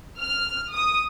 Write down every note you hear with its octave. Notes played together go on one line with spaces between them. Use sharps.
F6
D#6